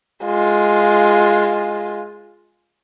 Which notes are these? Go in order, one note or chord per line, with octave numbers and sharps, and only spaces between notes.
G#3 F4